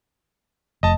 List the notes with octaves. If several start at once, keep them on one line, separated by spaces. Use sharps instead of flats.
F1 D#5 A5